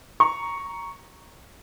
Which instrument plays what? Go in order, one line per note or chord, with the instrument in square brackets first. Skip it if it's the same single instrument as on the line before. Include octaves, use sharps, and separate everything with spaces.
[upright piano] A#5 C#6